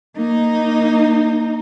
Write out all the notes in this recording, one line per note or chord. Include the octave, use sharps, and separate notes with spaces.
A#3 D#4